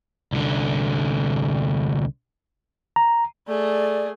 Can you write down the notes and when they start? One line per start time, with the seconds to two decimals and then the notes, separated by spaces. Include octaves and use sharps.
0.32 C2 D3
2.96 A#5
3.48 A3 G#4 D5